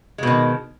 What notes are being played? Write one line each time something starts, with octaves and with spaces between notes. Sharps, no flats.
B2 D#3 G#3